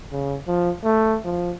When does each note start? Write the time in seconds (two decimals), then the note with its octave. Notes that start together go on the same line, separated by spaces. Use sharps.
0.12 C#3
0.48 F3
0.84 A3
1.25 F3